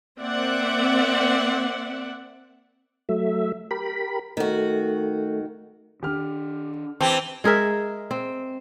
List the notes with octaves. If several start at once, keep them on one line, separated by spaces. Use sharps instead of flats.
A#3 C4 D5 E5 F#5
F#3 A3 E5
G4 A#4 B5
D#3 A3 F#4
D#3 D4 G4 F6
E3 C4 G4 A5
G#3 G#4 A#4 E5
C4